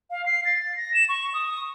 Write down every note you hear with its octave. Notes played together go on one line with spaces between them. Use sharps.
F5
C7
A6
A#6
E7
C#6
D#6